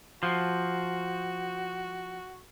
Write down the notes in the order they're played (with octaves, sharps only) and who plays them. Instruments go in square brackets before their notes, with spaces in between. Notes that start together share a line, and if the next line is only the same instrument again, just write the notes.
[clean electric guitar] F3 [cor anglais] F#4